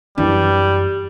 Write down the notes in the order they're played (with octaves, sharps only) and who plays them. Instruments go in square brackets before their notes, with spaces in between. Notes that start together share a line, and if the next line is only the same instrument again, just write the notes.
[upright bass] F#2 [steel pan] E3 D4 [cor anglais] G3 [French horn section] G4